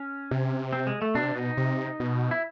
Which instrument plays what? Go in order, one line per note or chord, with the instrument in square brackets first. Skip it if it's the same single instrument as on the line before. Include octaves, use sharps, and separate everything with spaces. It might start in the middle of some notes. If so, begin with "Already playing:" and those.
Already playing: [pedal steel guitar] C#4
[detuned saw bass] C3
[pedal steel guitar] C4
G#3
A3
[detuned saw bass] B2 [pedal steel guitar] D4
[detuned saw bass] C3
[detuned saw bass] B2 [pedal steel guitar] D#4
[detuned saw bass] C3
B2
[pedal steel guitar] E4